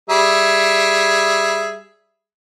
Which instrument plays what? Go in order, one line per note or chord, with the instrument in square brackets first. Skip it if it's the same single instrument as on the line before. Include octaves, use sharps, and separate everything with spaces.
[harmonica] G3 G#4 E5